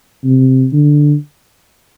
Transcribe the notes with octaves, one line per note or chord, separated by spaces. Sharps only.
C3
D3